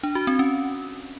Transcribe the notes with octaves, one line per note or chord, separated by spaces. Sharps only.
D4
F#4
C4
C#4